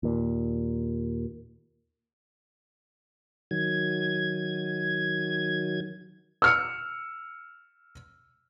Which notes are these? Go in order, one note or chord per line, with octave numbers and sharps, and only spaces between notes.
D#2 A#2
D#3 F#3 G#6
E6 F6 C#7